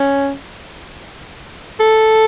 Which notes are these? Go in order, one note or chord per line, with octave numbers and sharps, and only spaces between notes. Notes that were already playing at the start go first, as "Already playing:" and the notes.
Already playing: C#4
A4